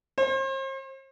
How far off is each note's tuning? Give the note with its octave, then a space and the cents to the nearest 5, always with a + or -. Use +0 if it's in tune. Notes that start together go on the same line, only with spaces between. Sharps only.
C5 +40